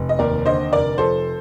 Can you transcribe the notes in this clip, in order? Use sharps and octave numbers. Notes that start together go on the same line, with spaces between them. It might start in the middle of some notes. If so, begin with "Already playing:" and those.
Already playing: F1
D#5
D#2 A#4 D5
D3 C5 D#5
F1 A#4 D5
F3 A4 C5